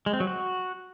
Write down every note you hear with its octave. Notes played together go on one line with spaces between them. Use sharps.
G#3
C4
F#3
F#4